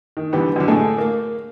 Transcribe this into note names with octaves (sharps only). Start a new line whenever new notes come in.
D#3
D3 E3 G3 B3 G4
F#2 D3
A2 A3 G#4 A4 G#5
A#3